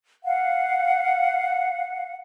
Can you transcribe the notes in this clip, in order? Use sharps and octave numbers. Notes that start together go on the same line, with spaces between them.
F5 F#5